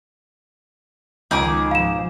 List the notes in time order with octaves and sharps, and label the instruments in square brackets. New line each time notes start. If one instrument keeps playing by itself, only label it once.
[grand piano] C#2 [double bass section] D#3 F3 [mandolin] D#4 G#4 D6
[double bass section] G#2 B2 F3 [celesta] F5 E7